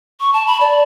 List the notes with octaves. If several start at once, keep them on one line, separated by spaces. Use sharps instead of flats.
C#6
A5
B5
D5